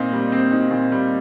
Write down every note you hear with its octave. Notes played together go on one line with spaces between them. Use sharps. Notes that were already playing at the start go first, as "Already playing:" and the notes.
Already playing: A#2 C4 D#4
G3
C4
D#4
A#2
G3